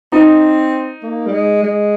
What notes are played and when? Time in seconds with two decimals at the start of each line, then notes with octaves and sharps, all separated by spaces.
0.12 C4 D#4
1.03 A#3
1.26 G3
1.32 G#3
1.63 G#3